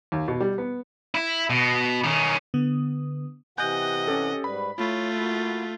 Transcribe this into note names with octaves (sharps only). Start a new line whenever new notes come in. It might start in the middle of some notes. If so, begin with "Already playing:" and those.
D#2
B2
G3
B3
E4
B2
D#3 C#4
D3 B3 D#6
C3 E3 D#5 F#5 G#5 F#6 G6
C#4 G4 A4
G#2 G3 B4 B5
A3 E4 F4 C#5
A#3 E4 F#4